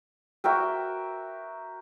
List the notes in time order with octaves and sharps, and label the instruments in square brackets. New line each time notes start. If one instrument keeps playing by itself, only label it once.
[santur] F#4 A#4 E5 G5